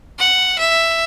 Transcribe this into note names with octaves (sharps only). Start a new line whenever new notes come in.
F#5
E5